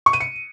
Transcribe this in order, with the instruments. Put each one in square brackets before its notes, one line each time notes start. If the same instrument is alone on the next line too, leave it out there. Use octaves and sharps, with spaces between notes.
[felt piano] C#6
D#7
C#7